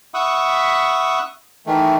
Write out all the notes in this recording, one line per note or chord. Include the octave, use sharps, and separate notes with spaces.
E5 F#5 B5 C#6 D#6
D#3 E3 A3